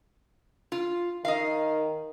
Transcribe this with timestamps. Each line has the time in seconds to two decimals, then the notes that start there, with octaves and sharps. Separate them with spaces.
0.72 F4
1.25 D#3 D#5 F5